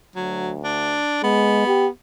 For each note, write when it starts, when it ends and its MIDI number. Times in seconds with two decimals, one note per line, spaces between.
0.16 1.01 38
0.16 0.51 54
0.64 1.21 62
1.24 1.64 56
1.24 1.88 59
1.67 1.87 67